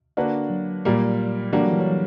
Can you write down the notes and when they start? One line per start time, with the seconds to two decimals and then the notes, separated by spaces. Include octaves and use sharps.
0.17 D3 A#3 D4 F#4 B4
0.50 F#3
0.85 A#2 G3 A#3
1.52 D3 E3 G3 A#3 D4 F#4
1.61 F#3
1.71 E3
1.79 F#3
1.87 G3